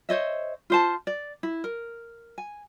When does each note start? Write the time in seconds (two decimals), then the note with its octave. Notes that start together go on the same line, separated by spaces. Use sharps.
0.09 C5 C#5 D#5 E5
0.70 F4 C5 A5
1.07 D5
1.43 E4
1.64 A#4
2.38 G#5